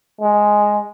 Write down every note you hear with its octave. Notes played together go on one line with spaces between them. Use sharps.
G#3